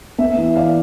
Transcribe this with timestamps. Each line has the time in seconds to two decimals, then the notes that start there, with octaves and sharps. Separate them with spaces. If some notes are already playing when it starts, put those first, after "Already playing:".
0.18 B3 E5
0.37 E3
0.56 E3 D5 F5